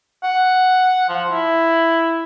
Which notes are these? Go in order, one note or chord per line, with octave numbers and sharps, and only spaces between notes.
F#5
F3
E4